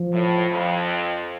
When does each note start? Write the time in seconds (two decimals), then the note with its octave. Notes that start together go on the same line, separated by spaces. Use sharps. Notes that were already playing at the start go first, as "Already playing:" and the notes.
Already playing: F3
0.13 A2
0.49 F2